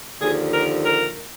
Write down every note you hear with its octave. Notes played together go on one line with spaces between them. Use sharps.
D#2 D3 F3 G#4
A#4
A#4